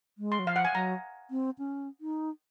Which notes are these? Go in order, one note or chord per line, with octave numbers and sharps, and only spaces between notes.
G#3
C6
F#3
F3 F5
F#5
G#5
F#3 A#5
C4
C#4
D#4